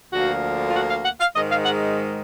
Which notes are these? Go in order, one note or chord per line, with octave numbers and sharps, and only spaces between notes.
D2 D3 F3 A#3 F#4
F4
F#4
F5
F#5
F5
G#2 D#3 G#3 D#5
F5
F#5